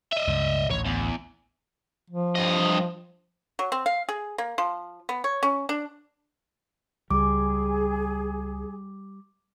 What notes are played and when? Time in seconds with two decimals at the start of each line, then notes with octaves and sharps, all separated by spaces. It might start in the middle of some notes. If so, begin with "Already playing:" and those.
0.12 D#5 E5
0.27 C#2 G2
0.70 A1 D2 C#5
0.85 E2
2.10 F3
2.35 G2 D#5
3.59 F#3
3.72 C4
3.86 F5
4.09 G#4
4.38 A#3
4.58 F3
5.09 B3
5.24 C#5
5.43 C#4
5.69 D4
7.11 C#2 G3 G#4 D6